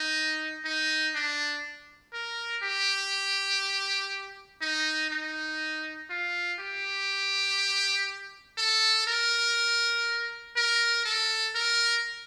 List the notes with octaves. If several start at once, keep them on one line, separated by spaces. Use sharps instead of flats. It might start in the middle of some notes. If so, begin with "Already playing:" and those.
Already playing: D#4
D#4
D4
A#4
G4
D#4
D#4
F4
G4
A4
A#4
A#4
A4
A#4